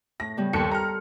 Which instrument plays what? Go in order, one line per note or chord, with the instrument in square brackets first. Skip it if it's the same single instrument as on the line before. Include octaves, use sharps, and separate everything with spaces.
[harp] A2 [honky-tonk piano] A#6
[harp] C#3 G3 B3
[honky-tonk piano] D#2 C#7 [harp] A4 C6
[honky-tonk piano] A#5 F6